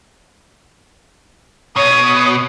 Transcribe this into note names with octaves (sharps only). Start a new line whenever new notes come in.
B2 C#5 D#6